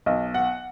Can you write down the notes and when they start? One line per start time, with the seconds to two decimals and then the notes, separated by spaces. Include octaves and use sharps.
0.06 B1 D#5
0.34 F#5